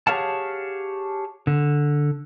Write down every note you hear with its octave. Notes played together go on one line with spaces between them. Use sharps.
G4 G#4 C#5 F5 F#5 A5
D3